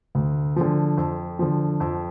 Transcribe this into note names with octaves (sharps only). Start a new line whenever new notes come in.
D2
D3 F3
F2
D3 F3
F2